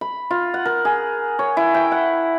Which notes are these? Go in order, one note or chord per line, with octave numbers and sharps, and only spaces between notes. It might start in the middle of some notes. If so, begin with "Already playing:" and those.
B5
F4
F#5
A#4
G#4
C#5
E4
G5
F#5